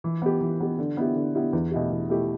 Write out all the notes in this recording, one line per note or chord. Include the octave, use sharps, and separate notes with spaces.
E3
B3 G4
E3
B3 G4
D3
B3 E4 G4
D3
B3 E4 G4
E2
B2 A3 E4 G4
E2
B2 A3 E4 G4